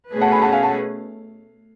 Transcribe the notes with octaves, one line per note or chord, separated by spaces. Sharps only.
B2 A3 C#4 G#4 B4
F#5 A5
G#5 B5
F#5 A5
F5 G#5
F#5 A5